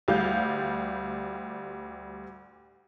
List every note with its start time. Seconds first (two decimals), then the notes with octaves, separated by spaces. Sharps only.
0.08 D2 G3 F5 G6